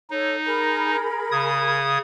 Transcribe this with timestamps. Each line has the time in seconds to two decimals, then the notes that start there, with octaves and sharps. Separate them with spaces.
0.10 D#4 A4 C#5
0.45 G#4 A#4 B5
1.31 C#3 D#6 G#6